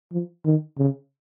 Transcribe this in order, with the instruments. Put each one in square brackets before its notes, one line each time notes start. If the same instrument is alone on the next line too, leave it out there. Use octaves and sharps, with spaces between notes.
[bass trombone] F3
D#3
C#3